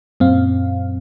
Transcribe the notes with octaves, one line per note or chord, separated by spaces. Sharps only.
F#2 A#2 C4 F5